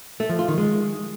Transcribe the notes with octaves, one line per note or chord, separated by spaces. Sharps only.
A3
F3
F4
D#3
G#3